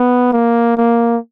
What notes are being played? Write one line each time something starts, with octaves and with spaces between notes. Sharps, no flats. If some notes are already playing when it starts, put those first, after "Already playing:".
Already playing: B3
A#3
A#3